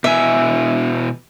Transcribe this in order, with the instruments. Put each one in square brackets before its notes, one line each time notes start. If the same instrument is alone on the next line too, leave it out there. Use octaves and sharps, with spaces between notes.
[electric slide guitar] B2 E3 G#5 [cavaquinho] E5